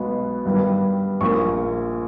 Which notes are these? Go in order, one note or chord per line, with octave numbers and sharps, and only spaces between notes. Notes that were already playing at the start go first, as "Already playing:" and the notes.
Already playing: B1 B2 G#3 B3
G2 D#3 G3 B3
A#1 A#2 A#3 C#6